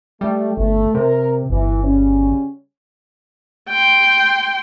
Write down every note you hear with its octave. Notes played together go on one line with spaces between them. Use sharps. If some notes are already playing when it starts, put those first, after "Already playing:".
G3 A3
G1 A3
C3 A#4
G1 E3
C#3 G3 C#4
G5 C6